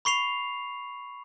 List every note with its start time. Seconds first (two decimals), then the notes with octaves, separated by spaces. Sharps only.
0.05 B5 C#6 C7 F7